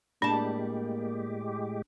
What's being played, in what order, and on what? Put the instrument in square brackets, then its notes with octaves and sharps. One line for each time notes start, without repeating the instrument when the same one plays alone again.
[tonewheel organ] A2 G#3 G4 [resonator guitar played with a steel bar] G3 A5 [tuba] A#3 [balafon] D4